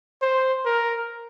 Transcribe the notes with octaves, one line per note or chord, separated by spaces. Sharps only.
C5
A#4